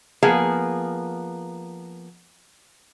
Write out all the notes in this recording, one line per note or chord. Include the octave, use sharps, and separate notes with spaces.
F3 A#3 B3 G#4